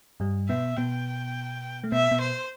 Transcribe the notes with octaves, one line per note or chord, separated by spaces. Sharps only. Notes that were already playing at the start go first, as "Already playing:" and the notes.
G2 G3
B2 B3 E5
B2 B3 G5
A3
B2 B3 E5
B2 B3
C5